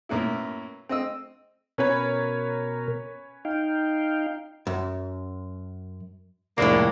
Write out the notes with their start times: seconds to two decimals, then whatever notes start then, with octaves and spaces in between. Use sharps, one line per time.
0.09 F#2 A2 A#3 B3 E4
0.89 C4 D#5 E6
1.78 B2 C#4 A#4 B4 C#5
3.45 D#4 F5 G5
4.67 F#2
6.58 C2 F2 A2 G#3 A#3 D4